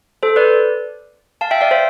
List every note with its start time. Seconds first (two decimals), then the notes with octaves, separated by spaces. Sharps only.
0.23 A4 C5
0.36 B4 D5
1.41 F5 A5
1.51 E5 G5
1.61 D5 F5
1.71 C5 E5